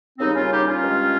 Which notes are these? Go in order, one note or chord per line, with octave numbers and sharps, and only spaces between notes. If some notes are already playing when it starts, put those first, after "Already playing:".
D#2 C#3 G3 C4 D#4
C#4 F4
D#4 G4
C#4 F4
G2 D#3 G#3